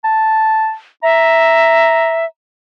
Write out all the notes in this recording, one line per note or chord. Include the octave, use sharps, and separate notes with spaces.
A5
E5 A#5